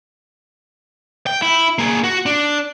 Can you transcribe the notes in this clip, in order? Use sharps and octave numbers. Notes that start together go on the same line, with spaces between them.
G5
E4
A#3 G#4
F#4
D4